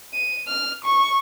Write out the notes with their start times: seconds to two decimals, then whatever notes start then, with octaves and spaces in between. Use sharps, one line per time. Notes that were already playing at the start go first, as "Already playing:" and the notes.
0.14 D#7
0.48 F6
0.84 C#6